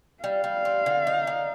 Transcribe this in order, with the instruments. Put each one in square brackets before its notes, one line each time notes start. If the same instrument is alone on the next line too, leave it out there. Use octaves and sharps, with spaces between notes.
[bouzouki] G3 [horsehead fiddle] F5
[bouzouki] G3
C4
D3
D#4
D3